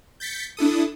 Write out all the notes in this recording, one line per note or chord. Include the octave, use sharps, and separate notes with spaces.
G6 A6 B6 C#7
D4 E4 A4 D#6